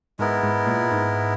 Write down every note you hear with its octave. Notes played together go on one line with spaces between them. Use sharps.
G#2 G#3 B3 E4 A#4
G#2
A#2
G#2